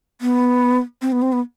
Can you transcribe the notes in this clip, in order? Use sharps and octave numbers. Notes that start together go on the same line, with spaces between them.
B3
C4
B3
C4
B3